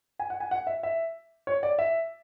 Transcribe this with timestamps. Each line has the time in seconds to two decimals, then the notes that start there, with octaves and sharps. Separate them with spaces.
0.19 G#5
0.30 F#5
0.40 G#5
0.51 F#5
0.67 E5
0.83 E5
1.47 C#5
1.63 D5
1.79 E5